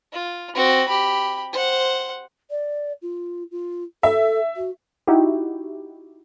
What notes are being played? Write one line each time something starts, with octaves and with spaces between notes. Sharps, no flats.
F4
C4 F#4
G4 B5
C5 F#5
D5
F4
F4
A4 E5
F#4
D#4 E4 F#4 G4